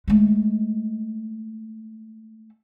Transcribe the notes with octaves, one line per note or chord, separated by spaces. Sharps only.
G#3 A3